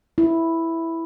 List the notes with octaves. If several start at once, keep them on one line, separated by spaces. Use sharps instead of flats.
E4